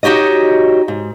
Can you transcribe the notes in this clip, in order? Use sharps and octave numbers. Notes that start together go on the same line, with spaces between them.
D#4 F#4 G4 C#5 D#5
G#2